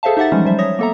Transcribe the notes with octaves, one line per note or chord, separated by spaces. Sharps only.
G#4 A4 C5 E5 F5 A5
D#4 G4 E5 F#5 A6
E3 F3 G3 G#3 C#4 D#4
F#3 G3 C5 E5
C#5 E5 D#6 A#6
A#3 B3 A4 E5 A#5